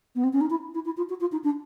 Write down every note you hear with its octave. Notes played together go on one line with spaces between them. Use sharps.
B3
C4
C#4
D#4
E4
E4
E4
F4
F#4
F4
D#4
D4